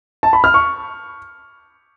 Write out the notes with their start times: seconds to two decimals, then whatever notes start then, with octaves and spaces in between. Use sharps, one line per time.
0.23 A5
0.33 B5
0.44 F6
0.54 C#6